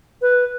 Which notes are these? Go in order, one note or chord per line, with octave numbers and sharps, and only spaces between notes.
B4